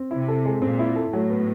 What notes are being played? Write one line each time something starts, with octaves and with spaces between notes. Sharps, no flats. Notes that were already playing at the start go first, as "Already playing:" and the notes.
Already playing: C4
C3 E4
A4
G#3
A#2 C4
E4
A4
A2 F#3
B3